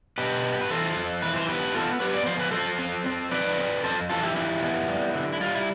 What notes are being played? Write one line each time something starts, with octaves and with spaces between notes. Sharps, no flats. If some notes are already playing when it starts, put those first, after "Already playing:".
B2 G4 B4
B3
B4
E3 A4 C5
F2
E3 B4
C5
B3 G4 B4
B3 F4 A4
B3 G4 B4
D5
F3 C5
B4
F3 A4 C5
C4
C4
F3 B4 D5
C4
F2 A4 C5
E3 F4 A4
E4 G4
F2 E4 G4
B3
G3
D3
E4
G3 F4
E4